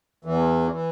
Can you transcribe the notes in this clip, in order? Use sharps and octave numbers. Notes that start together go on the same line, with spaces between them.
E2 E3
E3